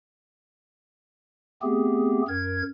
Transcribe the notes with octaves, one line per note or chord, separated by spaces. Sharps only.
A3 B3 C4 G4 G#4
F#2 A#4 G#6